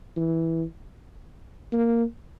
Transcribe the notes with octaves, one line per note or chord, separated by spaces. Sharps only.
E3
A#3